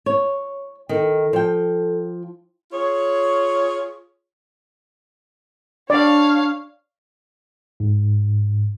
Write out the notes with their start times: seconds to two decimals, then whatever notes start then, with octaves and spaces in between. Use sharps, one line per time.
0.06 C#5
0.89 D#3 A4
1.33 F3 G5
2.72 F4 G#4 C#5
5.90 D4 C#5 D5 F5
7.80 G#2